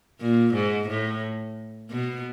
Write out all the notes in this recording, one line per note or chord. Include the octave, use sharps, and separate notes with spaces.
A#2
G#2
A2
B2